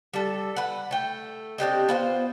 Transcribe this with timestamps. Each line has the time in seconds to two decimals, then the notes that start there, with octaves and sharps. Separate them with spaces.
0.14 G3 A4
0.56 B4 F#5
0.91 A3 G5
1.58 C4 D4 G4 D#5
1.88 B3 F4 C5